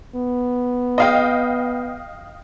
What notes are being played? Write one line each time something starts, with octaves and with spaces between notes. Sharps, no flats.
B3
D#5 F5 G5